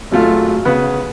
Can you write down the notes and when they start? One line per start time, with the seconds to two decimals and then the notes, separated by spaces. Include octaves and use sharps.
0.12 G#1 F#3 A3 F4
0.65 C#3 B3 B4